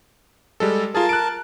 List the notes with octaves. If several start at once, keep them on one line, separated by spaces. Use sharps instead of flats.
G3 G#3 A4
F4 G#4 A#4 A5
F#6 D7